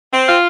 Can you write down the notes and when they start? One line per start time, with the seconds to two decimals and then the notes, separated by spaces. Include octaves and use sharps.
0.13 C4
0.28 F4